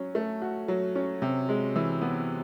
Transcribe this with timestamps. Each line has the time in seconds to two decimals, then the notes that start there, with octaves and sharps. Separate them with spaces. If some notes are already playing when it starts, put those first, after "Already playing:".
Already playing: F#3 C#4
0.15 A3
0.42 F#4
0.68 F#3
0.95 C#4
1.22 C3
1.49 G#3
1.76 E3
2.02 B3